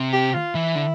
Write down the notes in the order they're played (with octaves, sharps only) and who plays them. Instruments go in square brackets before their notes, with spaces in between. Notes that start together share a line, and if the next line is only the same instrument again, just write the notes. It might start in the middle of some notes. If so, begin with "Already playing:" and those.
Already playing: [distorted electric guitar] C3
[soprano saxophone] G4
F4
[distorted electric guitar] E3 [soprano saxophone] E4
[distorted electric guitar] D3